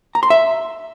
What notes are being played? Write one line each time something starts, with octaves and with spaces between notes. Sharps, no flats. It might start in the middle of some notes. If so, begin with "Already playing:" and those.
A#5
C6
E5